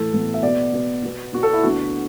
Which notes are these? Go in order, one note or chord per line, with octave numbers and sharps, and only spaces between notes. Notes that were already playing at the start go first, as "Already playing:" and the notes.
Already playing: A2 E3 A4
A2 E3 B3
E5
B2 B3 D5
B2 B3
B2 B3
B2 B3 F#4
A4
E4
D2 D3 B3 F#4